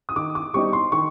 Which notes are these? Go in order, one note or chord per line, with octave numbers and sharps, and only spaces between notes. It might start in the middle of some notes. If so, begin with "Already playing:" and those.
D#6
D#3 D6
D6
G3 C4 D#4 C#6
C6
D#3 C#6